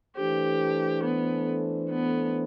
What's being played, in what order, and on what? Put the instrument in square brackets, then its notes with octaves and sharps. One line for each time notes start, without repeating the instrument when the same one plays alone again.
[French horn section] E3 A3 D4 A4 C5 [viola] G4
[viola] B3
B3